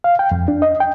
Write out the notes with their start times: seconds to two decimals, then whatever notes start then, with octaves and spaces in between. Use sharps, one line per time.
0.04 F5
0.19 G5
0.32 F2
0.48 D4
0.62 D#5
0.80 G5